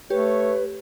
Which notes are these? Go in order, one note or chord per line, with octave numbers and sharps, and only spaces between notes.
A3 G4 B4 C#5